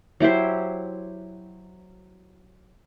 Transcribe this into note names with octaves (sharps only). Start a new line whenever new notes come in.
F#3 E4 G4 C5